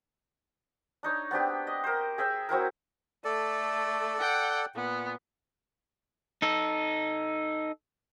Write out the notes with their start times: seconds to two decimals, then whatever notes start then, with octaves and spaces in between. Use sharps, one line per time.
1.03 D4 D#4 C#5
1.31 B3 C4 D4 G4
1.67 D#5
1.84 A#4 C5
2.18 G#4 E5 G5 E6
2.49 F#3 C4 E4 A#4
3.24 A3 A4 D5
4.20 F#5 G5
4.76 A#2 B3
6.42 D#4 A4